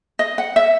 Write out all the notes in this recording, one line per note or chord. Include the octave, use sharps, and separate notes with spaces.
D#5
F#5
E5